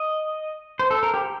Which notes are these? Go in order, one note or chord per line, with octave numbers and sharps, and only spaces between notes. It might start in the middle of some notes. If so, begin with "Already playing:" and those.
Already playing: D#5
C5
A4
A#4
G4